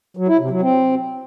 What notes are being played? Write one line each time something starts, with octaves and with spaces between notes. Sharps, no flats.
F#3
E4
C3
F#3
C4